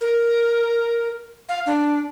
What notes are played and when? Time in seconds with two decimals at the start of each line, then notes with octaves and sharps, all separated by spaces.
0.01 A#4
1.49 F5
1.66 D4